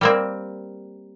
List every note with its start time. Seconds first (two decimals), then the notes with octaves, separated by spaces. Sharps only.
0.01 G3 A#3 C4